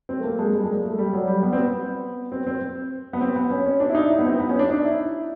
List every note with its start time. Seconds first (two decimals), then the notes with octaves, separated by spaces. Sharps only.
0.09 C4
0.20 A3
0.24 A#3
0.39 G#3
0.53 G3
0.64 G#3
0.73 A#3
0.84 A3
0.99 G3
1.13 F#3
1.27 G3
1.43 B3
1.53 C4
1.57 B3
2.32 C4
2.47 C4
3.13 B3
3.21 C4
3.36 B3
3.50 C#4
3.65 C#4
3.80 D4
3.90 E4
3.95 D#4
4.10 E4
4.19 B3
4.25 C4
4.40 B3
4.49 C#4
4.59 D4
4.69 D#4
4.85 E4